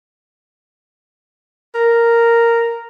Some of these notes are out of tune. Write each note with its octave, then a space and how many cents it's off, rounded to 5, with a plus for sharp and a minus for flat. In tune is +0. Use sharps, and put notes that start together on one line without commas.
A#4 -5